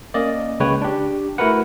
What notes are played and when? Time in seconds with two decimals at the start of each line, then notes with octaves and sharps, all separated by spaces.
0.14 A#3 C#4 D5 D#5
0.60 C#2 C#3 G#3 B4 C#5 G5
0.82 D4 G4
1.38 A3 E4 F#4 A#4 B4 F#5